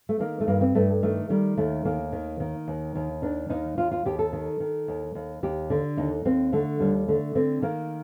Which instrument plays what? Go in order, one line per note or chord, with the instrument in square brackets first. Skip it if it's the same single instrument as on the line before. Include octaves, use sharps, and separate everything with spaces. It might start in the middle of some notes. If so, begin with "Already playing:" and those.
[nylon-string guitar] A3
D#3 A#3
A3
G2 A#3
C4
G2 A3
D#3 A3
D#3 G3
D#2 A3
D#2 A#3
D#3
D#3
D#2
D#2
D#3 D4
D#2 D#4
D#2 F4
F4
D#2 G4
A4
D#3
D#3
D#2
D#2
D#2 G4
D3
D#2 D#4
D#2 C4
D3 A3
D#2 G3
D3 A3
D3 C4
D#3 A#3